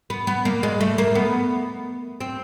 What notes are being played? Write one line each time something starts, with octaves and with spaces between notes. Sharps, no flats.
B3
B3
A#3
G#3
A3
A#3
B3
C4